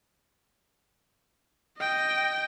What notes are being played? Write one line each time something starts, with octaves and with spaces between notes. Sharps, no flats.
D#5 G5